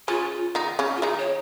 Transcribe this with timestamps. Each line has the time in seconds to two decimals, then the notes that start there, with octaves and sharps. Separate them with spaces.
0.08 C#3 C#4 F4
0.55 D#3 D#4
0.79 C#3 C#4
0.96 F4
1.02 D#3 D#4 G#4
1.19 C#5